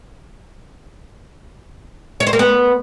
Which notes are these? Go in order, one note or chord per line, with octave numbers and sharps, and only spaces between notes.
C#5
C5
A#3
B3